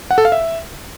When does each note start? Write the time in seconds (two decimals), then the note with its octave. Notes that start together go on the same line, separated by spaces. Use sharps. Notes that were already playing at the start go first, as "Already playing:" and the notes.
0.11 F#5
0.18 A4
0.25 F5
0.32 E5